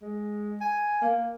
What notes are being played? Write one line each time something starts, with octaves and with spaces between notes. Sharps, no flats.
G#3
G#5
A#3